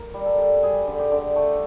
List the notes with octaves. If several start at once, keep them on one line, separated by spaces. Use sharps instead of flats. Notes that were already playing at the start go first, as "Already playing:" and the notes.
Already playing: A#4
G3
A4
G3
G3 G#4
D3
G4
D3
A3 A4